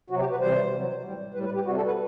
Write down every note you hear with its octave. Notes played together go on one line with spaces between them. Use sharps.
C3 F#3 F#4
G4
B4
C3 E3 G3 C5
C3 F#3
A2 G3
A2 G3 B4
B4
G4
C3 G3 F#4
A4
B4